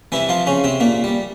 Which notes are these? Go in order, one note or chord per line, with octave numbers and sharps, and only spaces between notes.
C2 C3 E3 E4
F3 F4
C#3 C#4
C3 C4
A#2 A#3
G3